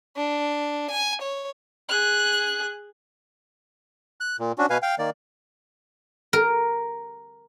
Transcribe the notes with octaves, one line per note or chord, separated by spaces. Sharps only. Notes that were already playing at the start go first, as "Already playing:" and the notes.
D4
G#5
C#5
G#4 F#6
F#6
A#2
C#4 D4 F#4
B2 B4 F5 G#5
F5 G5
D#3 A#3 D5
A#4